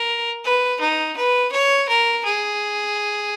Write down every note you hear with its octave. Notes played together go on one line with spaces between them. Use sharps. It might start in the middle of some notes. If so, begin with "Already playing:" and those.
Already playing: A#4
B4
D#4
B4
C#5
A#4
G#4